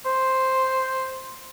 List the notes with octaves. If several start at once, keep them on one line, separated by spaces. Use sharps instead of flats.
C5